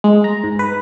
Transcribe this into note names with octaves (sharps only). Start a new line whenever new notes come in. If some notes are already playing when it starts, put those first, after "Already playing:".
G#3
A#5
G#2
B4